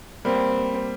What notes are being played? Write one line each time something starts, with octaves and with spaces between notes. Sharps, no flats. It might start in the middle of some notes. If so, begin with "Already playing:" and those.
G3 A#3 C4